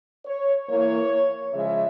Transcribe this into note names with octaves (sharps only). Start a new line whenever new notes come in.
C#5
E3 A#3 C#5
C#3 F3 G#3 E5